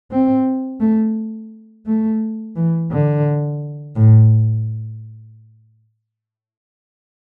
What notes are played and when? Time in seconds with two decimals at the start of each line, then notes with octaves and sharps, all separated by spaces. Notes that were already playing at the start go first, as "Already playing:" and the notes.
0.11 C4
0.80 A3
1.87 A3
2.56 E3
2.91 D3
3.96 A2